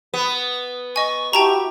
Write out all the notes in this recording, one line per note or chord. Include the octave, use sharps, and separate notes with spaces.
B3
D#5 G#5 C#6
E4 F#4 G4 G5 A5 A#5